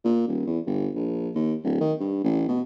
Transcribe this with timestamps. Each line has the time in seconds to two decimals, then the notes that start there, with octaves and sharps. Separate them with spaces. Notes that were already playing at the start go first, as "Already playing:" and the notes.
0.05 A#2
0.28 D#1
0.47 E2
0.67 G1
0.96 A#1
1.35 D#2
1.64 D1
1.81 D#3
2.00 G2
2.24 A1
2.48 B2